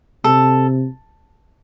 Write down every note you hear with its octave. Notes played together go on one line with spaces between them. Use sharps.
C3 A4